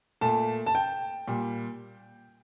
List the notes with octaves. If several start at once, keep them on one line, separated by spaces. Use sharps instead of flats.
A#2 A3 A5
A5
G5
A#2 G3